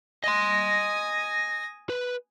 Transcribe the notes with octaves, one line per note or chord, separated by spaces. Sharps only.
D#5 G#5 C6 D#6 A#6
B4